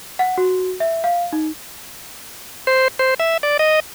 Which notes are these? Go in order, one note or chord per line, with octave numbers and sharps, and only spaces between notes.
F#5
F#4
E5
F5
D#4
C5
C5
E5
D5
D#5